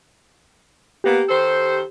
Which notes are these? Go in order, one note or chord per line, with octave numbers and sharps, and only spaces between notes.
A#3 B3 G4
D#3 A4 C5